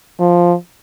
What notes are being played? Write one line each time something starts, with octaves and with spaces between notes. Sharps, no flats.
F3